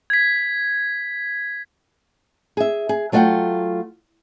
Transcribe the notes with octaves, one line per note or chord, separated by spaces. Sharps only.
G#6 B6
G#4 E5
G#4
F#3 A3 F4 D#5 F#5 G5